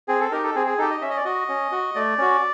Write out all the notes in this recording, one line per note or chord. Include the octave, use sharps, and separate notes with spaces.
C4 G#4
A4
D#4 G4 A#4
A4
C4 G#4
G#4
D#4 G4 A4
D#5
C#4 E5
D#5
D5
F#4 D#5
C#4
F#4
A3 D5
C#4 F#4